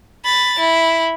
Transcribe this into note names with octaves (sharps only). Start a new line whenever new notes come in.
B5 A6
E4